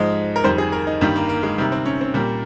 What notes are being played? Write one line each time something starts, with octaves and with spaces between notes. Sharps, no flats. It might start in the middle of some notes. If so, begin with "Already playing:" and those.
Already playing: G#2 F3 G#3 D#5
A#4
F2 D#3 G3 C5
G#4
A#4
D#4
G2 D#3 G3 A#3
A#3
A#3
G#3
C3 D#3 G3 A#3
C4
C#4
C4
A#2 G3 A#3